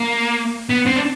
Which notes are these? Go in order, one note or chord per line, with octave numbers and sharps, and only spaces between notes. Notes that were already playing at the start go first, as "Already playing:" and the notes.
Already playing: A#3
B3
C4
D4